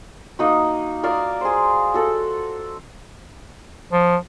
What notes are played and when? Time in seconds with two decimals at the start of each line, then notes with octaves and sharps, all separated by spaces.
0.39 A#3 D#4 F#4
1.03 F#4 A#4 D5 F5
1.41 G#4 C5
1.94 F#4 A4
3.92 F3